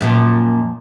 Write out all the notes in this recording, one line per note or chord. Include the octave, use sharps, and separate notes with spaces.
F#2 A#2 F3